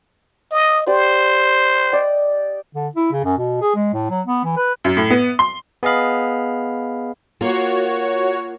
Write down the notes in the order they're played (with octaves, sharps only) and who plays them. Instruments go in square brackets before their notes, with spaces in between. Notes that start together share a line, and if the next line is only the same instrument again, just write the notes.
[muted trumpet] D#5
[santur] G4 D5 C6 [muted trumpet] C5
[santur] D5 D#5 G5
[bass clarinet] D3
E4
C#3
F#2
B2
G#4
G#3
A2
F#3
B3
E3
B4
[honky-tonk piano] F#2
A2
B3
C6
[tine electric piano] B3 G#4 D#5 F5 B5
[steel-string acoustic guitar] A#3 F4 A#4 [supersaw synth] F#4 C#5